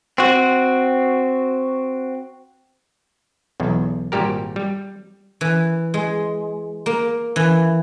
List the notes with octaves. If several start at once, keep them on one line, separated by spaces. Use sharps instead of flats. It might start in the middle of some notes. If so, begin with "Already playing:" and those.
C4 F#4
B1 E2
G#1 A#2 G3 G4 A#4
G3
E3
G#3
A#3
E3